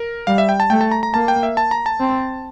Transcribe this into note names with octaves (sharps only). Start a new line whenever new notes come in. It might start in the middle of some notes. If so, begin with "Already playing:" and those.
Already playing: A#4
G3 F5
E5
G5
A5
A3 G5
A5
A#5
A#5
A#3 A5
G5
E5
A5
A#5
A5
C4